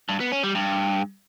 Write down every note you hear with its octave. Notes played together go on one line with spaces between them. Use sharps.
G2
B3
C#4
G3
G2